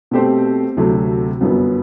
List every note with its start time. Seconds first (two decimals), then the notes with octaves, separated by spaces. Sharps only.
0.11 B2 A3 C4 G4 C5
0.77 D2 C3 F#3 A3 C4
1.41 G1 F#2 F#3 B3